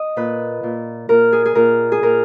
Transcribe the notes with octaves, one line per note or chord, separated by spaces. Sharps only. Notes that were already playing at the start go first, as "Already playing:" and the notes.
Already playing: D#5
A#2 B4
A#2
A#2 A#4
G#4
G#4
A#2 A#4
G#4
A#2 A#4